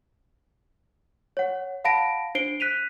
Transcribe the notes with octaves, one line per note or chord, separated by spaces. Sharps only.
C#5 F#5
F5 F#5 A5 B5 A#6 D7
D4 C5 C7 D7 G7
F#6 B6 D#7 F7